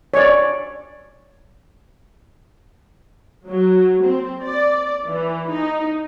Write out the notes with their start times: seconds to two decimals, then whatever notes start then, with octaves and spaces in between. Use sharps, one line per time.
0.14 C#5 D5
3.47 F#3
4.02 C4
4.44 D5
5.08 E3
5.53 D#4